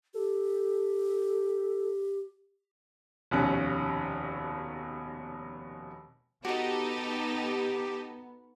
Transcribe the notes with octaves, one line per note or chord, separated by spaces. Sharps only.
G4 A4
F1 D#2 B2 C#4 F#6
B3 D#4 F#4 G4 A4 D#5